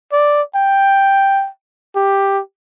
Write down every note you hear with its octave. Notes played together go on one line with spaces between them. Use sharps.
D5
G5
G4